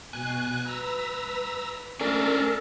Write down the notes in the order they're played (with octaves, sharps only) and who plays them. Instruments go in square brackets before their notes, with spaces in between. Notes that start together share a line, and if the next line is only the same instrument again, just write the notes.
[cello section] B2 [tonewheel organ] G#5 F#6
[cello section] B4 [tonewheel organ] A#5 E6
[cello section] A3 [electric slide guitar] C#4 D4 D5 [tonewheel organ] A4 A#4